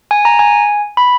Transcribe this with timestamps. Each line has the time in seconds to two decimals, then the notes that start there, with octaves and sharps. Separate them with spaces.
0.11 G#5
0.25 A#5
0.39 G#5
0.97 B5